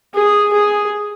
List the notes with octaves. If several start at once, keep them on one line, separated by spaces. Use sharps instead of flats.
G#4
G#4